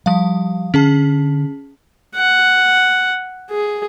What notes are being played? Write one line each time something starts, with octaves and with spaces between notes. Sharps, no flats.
F3 G3 F5
D3 C#4 G#4 A5
F#5
G#4